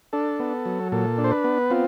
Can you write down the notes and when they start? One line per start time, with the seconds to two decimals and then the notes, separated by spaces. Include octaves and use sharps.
0.13 D4 A4
0.39 B3
0.66 F#3
0.92 A#2 A4
1.18 D4
1.24 C5
1.31 B4
1.44 B3
1.70 C4 F4